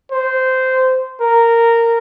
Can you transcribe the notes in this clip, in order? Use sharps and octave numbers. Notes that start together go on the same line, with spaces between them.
C5
A#4